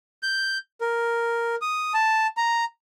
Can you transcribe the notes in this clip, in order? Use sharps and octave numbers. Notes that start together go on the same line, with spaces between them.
G6
A#4
D#6
A5
A#5